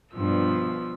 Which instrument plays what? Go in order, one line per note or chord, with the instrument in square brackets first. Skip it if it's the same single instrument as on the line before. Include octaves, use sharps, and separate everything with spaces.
[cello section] G2 [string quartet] B2 F3 E6